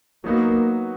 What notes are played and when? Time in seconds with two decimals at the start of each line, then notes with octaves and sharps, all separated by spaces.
0.24 F#3 A#3 B3 D#4 F#4